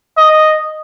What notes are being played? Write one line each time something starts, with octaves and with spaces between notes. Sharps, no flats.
D#5